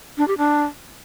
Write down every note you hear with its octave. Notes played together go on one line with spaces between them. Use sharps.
D4
G4
D4